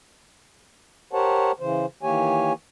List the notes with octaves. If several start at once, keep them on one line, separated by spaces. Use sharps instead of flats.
G4 A#4 C5 C#5 F#5 A5
C#3 E3 C5
D#3 E3 A#3 G4 C#5 G#5